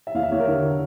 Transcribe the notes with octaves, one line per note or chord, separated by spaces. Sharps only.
E5
E2 F5
E5
E2 C#5
A#4
D3